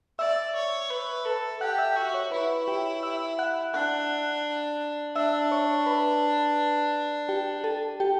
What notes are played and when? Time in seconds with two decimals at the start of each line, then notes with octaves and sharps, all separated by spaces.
0.19 D5 E5 E6
0.55 C#5
0.90 B4
1.25 A4
1.61 G4 F#5 F#6
1.78 E5 E6
1.96 F#4
2.14 C#5 C#6
2.31 E4 B4 B5
2.68 G4 G5
3.03 E5 E6
3.39 F#5 F#6
3.74 D4 F#5 F#6
5.16 D4 E5 E6
5.52 C#5 C#6
5.86 B4 B5
7.29 G4 G5
7.64 A4 A5
8.00 G4 G5